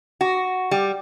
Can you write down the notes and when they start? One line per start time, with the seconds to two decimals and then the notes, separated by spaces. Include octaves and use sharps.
0.21 F#4
0.71 G3